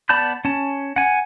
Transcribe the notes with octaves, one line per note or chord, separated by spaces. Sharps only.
B3 D5 A5 B5 G6
C#4 A5
F#5 G#5